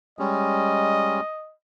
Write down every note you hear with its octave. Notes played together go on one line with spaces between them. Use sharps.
G3 G#3 C#4 D#5